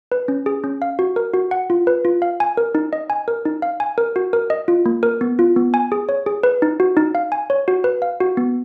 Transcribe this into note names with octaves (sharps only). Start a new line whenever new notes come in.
B4
C#4
G#4
C#4
F5
F#4
A#4
F#4
F#5
F4
B4
F4
F5
G#5
A#4
D#4
D#5
G#5
A#4
D#4
F5
G#5
A#4
F#4
A#4
D#5
F4
A#3
A#4
B3
F4
B3
G#5
G#4
C#5
G#4
B4
D#4
F#4
D#4
F5
G#5
C#5
F#4
B4
F5
F#4
B3